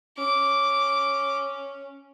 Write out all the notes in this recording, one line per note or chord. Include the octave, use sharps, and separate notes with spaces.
C#4 D6